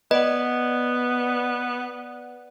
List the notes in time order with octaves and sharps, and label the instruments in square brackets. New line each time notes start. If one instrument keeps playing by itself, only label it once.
[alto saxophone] B3 [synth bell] B4 D5 F#5 [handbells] D#5